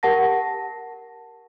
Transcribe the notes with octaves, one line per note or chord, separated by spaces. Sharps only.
G4 A#4 F#5 A5 A#6